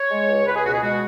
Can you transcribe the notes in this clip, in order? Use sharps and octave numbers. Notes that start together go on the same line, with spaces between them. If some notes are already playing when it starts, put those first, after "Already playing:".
Already playing: C#5
G#3
C#2
C#2 B4
G#4
B2 F#4
G#4
G#3 F#4